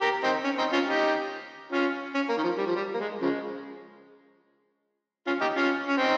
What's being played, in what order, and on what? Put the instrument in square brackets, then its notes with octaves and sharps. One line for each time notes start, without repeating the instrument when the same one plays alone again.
[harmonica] G4 A#4
C4 D#4
C#4
C4 D#4
C#4 F4
D#4 G4
C#4 F4
C#4
A#3
D#3
F3
G3
F3
G3
A#3
G#3
C#3 F3 G#3
C#4 F4
D#4 G4
C#4 F4
C#4
C4 D#4